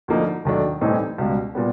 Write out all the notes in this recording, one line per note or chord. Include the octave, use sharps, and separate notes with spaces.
D2 D3 F3 A#3 D#4
D#2 D#3 F#3 A3 D4
A2 E3 G3 C4 D#4
C#2 B2 G3
A#2 G3 B3